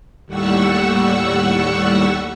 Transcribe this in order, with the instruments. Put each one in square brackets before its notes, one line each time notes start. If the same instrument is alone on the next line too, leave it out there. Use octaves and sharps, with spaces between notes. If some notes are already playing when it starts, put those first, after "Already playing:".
[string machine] D#2 A2 G3 F#5 C#6 E6